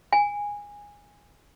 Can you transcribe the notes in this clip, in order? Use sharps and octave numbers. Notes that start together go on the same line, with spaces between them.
G#5